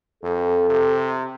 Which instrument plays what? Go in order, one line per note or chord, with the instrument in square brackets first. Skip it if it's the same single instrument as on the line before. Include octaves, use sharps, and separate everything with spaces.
[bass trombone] F2 [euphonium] A4
[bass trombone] C3